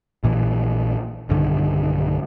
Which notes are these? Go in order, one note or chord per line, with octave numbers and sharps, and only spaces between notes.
A#1 A#2 E3
B1 G2 D3 D#3